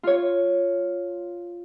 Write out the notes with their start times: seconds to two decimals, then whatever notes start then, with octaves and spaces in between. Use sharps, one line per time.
0.03 F4 C#5